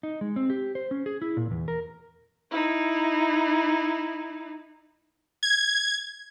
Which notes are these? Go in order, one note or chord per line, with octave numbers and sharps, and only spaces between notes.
D#4
G#3
C4
G4
C5
C#4
G#4
E4
A#2
E2
A#4
D#4 E4
G#6